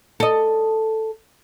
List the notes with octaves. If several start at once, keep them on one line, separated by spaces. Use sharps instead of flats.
A4 D#5